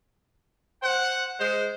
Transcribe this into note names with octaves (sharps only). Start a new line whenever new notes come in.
C5 F#5
G#3 C5